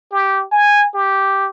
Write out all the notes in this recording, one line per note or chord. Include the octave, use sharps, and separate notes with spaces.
G4
G#5
G4